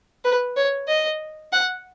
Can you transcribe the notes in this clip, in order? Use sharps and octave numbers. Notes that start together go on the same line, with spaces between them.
B4
C#5
D#5
F#5